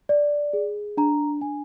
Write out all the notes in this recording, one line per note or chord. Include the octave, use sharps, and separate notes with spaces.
D5
G#4
D4 A#5
D4 G#5